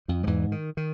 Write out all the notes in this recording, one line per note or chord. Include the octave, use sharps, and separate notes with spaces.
F2 F3
F3
E2 G#2 E3
D#3
D#3